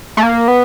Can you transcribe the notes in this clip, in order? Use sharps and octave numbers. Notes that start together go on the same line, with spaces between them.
A3
A#3
B3